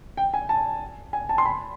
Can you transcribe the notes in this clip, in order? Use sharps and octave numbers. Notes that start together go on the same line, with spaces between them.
G5
G#5
A5
G#5
A5
C6
B5